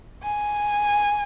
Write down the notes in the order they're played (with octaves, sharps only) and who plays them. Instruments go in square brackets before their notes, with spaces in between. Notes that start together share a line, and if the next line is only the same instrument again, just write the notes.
[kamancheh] G#5